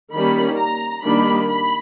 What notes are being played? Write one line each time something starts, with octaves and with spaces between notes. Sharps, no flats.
D#3 G3 A#3 C#4 B5
A#5
D#3 G3 A#3 D4 B5
B5